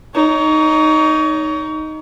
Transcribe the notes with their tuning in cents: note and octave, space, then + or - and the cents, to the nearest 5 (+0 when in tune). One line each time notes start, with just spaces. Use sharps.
D#4 +0 C#5 +35